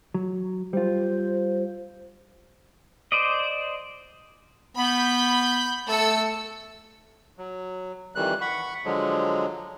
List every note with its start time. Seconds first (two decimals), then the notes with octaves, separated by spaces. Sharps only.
0.14 F#3
0.73 G3 F4 C5
3.12 C5 D5 D#5
4.77 B3 B5 G6
5.88 A3 A4 E6 C#7
7.38 F#3
8.15 F2 D#3 E3 G3 F#6
8.41 F#5 B5 C#6
8.85 D3 F3 F#3 G#3